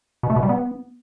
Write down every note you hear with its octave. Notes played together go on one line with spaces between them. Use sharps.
B2
A3
B2
G3
B3